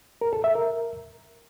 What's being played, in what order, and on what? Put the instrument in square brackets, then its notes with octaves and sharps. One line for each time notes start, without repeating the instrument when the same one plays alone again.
[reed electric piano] A#4
A4
E5
A#4